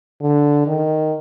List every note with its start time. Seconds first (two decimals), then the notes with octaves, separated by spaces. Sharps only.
0.21 D3
0.67 D#3